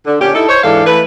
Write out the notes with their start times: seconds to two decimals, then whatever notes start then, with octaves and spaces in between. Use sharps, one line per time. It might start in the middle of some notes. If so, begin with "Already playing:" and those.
0.06 D3
0.20 A#2 D3 C#4 G4
0.34 D#4 E4 A4
0.48 C5 C#5
0.63 G#2 E3 D4 A4 F5
0.85 E3 A3 B4